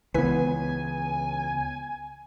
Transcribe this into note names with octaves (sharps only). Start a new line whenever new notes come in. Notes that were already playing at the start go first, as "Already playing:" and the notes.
C#2 E3 B3 E4 B4 G#5 B6